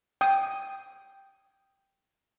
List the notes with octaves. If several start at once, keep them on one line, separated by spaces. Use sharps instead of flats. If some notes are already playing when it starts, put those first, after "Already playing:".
G5 D#6